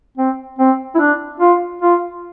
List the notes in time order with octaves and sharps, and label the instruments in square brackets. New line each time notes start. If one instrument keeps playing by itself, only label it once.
[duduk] C4
C4
E4
D4
F4
F4